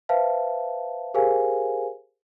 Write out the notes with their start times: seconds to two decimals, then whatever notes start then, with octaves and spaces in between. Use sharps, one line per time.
0.09 B4 C5 E5 F5 A5
1.14 G4 G#4 A#4 C5 F5 G#5